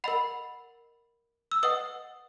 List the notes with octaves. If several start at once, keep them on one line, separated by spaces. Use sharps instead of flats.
A#4 D#5 F#5 B5
E6
B4 D#5 F#5 D#6